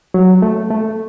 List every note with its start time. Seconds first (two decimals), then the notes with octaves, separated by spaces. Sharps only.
0.14 F#3
0.42 A3
0.70 A3